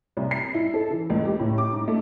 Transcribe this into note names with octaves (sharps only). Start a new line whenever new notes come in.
C2
C7
E4
A4
E3
C#2
G4
A2
D6
G#2
A3